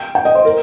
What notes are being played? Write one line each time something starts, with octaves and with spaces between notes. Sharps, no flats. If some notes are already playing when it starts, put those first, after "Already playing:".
Already playing: G5
G5
D#5
C5
A#4